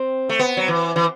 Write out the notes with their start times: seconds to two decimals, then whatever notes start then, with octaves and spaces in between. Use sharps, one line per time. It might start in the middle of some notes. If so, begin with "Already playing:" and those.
Already playing: C4
0.29 A3
0.39 B3
0.57 F#3
0.68 E3
0.96 E3